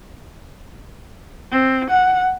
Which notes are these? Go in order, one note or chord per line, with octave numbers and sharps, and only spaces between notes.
C4
F#5